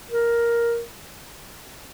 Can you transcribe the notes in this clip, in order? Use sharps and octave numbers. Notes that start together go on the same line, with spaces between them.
A#4